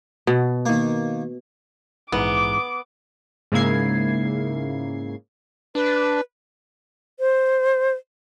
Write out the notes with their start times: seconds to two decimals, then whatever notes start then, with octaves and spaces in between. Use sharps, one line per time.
0.27 B2
0.66 D#3 A#3
2.12 A#1 G#2 E3 B3 D6
3.52 G#2 C#3 A#3 E4 G#6 C7
5.75 D4 B4
7.20 C5